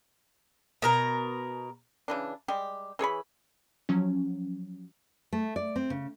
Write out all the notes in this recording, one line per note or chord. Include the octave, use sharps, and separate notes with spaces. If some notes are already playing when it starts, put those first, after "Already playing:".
B2 A#4 A#5
C#3 E3 D4
G3 G#3 G4
E3 G#4 C#5 B5
F3 F#3 C#4
A3
D5
C4
C#3